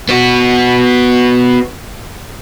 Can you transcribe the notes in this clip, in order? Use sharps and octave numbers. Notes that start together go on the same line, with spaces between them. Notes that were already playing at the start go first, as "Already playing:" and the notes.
B3 F#4